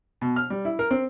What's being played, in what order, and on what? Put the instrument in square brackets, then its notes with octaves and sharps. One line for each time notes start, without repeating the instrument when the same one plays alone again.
[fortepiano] B2
F6
G3
E4
A#4
C4